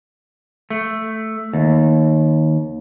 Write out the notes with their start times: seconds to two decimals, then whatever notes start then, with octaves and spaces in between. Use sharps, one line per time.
0.70 A3
1.53 D#2